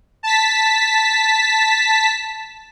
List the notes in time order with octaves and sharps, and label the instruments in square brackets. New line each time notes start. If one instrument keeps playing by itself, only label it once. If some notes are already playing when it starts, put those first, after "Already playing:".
[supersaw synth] A5 B6